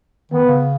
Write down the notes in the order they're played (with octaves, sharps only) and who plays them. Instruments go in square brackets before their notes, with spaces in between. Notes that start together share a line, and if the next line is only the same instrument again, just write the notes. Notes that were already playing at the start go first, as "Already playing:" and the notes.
[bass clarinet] D#3 [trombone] B3
[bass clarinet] C#3